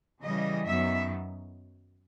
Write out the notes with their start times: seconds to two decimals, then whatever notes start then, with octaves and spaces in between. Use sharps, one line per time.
0.22 C#3 E3 G3 D#5
0.65 F#2 D#3 F#3 B3 E5